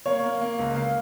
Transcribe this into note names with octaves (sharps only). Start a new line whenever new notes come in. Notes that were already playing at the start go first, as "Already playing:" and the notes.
A#3 C#5
A#3
A#3
C#2
A#3 F5